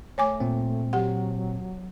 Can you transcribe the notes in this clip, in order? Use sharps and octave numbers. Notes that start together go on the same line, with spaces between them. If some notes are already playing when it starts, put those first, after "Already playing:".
A3 C#5 G#5 D6
A#2 C4
F#3 G4 F#5